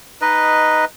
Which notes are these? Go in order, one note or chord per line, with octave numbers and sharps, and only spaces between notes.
D#4 B4 D#5